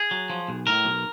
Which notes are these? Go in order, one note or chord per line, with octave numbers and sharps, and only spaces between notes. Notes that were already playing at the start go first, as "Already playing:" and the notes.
Already playing: G#4
F#3
F3
B1
A2 A#4
B1